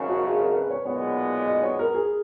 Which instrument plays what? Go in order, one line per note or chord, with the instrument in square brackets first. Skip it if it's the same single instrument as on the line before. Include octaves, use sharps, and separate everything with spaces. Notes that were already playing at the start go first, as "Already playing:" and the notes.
Already playing: [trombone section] G#1 F#2 C#3
[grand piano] F#4
G#4
A#4
B4
C#5
[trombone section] B1 A#2 G#3 B3 [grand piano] C#5
[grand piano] D#5
C#5
A#4
G#4